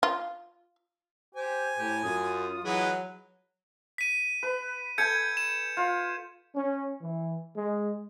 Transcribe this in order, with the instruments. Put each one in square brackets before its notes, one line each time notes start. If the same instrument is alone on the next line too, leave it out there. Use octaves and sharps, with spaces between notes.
[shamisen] F4
[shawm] G4 [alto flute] C5 [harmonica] G#5
[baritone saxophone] A2 [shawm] G4
[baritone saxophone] F#2 [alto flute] F4 [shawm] D#6
[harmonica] E3 G#3 B4 [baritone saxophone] F#3
[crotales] B6 D#7
[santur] B4
[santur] A4 G5 G#5 [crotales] G6 G#6 C#7
[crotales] E7
[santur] F4
[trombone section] C#4
E3
G#3